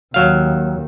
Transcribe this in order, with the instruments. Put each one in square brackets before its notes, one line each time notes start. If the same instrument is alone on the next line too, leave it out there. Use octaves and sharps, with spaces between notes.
[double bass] D#2 [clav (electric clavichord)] F#3 F5